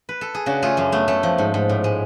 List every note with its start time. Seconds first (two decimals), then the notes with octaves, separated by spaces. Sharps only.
0.09 B4
0.21 A4
0.34 G#4
0.46 C#3 D4 F#4
0.62 A3 F4 G#4
0.77 F#2 C#4
0.92 A3 B3
1.08 A3 C#4
1.23 F3
1.38 G#2
1.54 G#2
1.69 A2
1.84 G#3